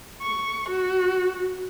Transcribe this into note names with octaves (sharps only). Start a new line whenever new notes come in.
C#6
F#4